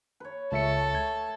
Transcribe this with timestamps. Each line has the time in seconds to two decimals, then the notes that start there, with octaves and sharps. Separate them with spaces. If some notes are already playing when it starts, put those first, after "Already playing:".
0.20 B4 C#5
0.52 C#2 A3 A4 E5 C#7
0.95 G#6